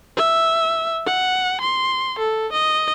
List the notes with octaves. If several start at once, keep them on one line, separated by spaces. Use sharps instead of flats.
E5
F#5
C6
A4
D#5